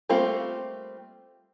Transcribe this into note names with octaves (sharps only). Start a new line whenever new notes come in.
G3 A3 A#3 C4 F4